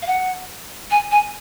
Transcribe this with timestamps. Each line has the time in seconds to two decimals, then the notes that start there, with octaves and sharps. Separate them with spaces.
0.02 F5
0.06 F#5
0.91 G#5
1.11 G#5